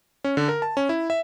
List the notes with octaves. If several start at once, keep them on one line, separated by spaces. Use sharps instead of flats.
C#4
D3
A#4
A5
C#4
E4
E5